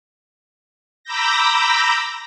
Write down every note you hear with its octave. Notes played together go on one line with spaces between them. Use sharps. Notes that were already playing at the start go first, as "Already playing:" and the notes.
A#5 B5 D6 E6 G6 A#6